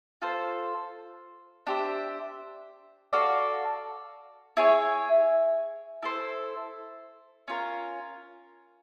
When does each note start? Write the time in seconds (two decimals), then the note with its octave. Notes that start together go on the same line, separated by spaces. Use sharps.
0.22 F4 A4 C5
1.67 D4 G4 C5 E5
3.13 F#4 A4 D5 F5
4.57 E4 G#4 C#5
6.03 E4 A4 C5
7.48 C#4 F4 A#4